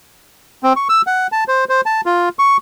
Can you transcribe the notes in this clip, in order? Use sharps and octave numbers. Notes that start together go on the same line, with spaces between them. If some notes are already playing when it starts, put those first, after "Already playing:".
C4
C#6
E6
F#5
A5
C5
C5
A5
F4
C#6